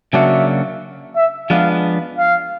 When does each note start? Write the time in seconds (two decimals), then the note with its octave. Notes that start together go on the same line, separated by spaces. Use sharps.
0.13 C#3 F#3 A#3 D4 F#4 E5
1.15 E5
1.50 F3 G#3 B3 D4 F5
2.18 F5